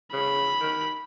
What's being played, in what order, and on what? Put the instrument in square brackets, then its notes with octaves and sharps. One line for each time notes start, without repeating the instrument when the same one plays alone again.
[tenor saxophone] C#3 [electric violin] B5
[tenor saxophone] D#3